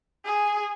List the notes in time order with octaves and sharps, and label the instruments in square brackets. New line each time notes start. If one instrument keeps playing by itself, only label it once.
[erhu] G#4